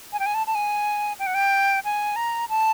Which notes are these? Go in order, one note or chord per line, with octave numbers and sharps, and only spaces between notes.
G#5
G5
G#5
A5
A5
G#5
G5
F#5
G5
G#5
A#5
A5